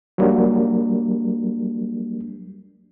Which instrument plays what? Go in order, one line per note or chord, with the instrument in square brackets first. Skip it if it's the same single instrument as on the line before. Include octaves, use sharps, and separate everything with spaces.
[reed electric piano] F#3 G3 A#3 D4